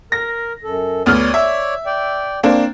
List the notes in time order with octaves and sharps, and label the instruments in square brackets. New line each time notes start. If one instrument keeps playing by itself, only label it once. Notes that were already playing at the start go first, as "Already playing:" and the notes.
[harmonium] A#4 [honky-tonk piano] A#6
[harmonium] F#2 A4
[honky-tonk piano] D2 B3 F6 [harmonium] C#5 D5
[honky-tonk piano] E5
[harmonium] D5 G5
[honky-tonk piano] A#3 C4 D4